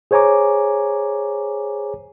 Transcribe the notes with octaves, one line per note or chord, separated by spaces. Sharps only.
G#4 C5 C#5 G#5 A#5 D6